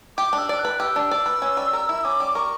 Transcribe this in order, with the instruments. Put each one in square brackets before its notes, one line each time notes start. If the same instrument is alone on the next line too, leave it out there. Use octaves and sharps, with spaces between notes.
[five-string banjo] G4 [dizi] D6
[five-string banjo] D4
[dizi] E6
[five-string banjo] D5
[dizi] F#6
[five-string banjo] B4
[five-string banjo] G4 [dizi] E6
[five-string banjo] D4
D5
B4
C#4
G3
A#4
E4
[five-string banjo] C#4 [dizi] D6
[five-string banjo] G3
[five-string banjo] A#4 [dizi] C#6